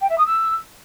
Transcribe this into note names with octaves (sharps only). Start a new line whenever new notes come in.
G5
E5
D#6
E6